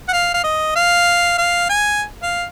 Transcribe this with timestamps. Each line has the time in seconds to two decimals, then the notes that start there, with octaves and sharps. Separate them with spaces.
0.08 F#5
0.13 F5
0.34 F5
0.44 D#5
0.75 F5
1.38 F5
1.69 G#5
2.23 F5